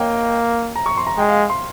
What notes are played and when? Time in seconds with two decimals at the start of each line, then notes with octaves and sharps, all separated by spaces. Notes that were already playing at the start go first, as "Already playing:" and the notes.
Already playing: A#3 C#5 D#5 G5
0.76 A#5
0.86 C#6
0.97 C6
1.07 A#5
1.17 G#3 G5
1.29 F5
1.50 C6